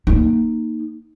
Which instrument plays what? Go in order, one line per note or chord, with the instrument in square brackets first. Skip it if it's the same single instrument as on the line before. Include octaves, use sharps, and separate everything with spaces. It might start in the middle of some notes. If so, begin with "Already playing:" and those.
[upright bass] A#3 D#4